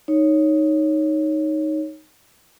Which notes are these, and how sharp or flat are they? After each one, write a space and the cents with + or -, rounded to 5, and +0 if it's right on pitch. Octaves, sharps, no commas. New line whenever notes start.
D#4 +0 C#5 +0